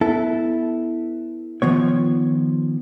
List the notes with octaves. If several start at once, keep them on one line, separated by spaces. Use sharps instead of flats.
B3 E4 A4
D#3 F3 B3 C#5